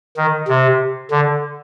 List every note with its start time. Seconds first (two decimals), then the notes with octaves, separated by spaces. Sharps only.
0.17 D#3
0.48 C3
1.11 D3